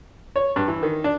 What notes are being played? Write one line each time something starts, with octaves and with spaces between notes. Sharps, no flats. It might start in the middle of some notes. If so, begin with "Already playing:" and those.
C#5
G2
E3
D#3
D4